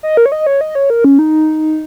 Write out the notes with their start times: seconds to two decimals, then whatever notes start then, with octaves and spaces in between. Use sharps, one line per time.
0.03 D#5
0.17 A#4
0.26 C#5
0.32 D#5
0.47 C#5
0.61 D#5
0.75 C#5
0.90 A#4
1.04 C#4
1.19 D#4